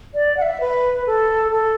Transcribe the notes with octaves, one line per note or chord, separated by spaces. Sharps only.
D5
F#5
E5
B4
A4
A4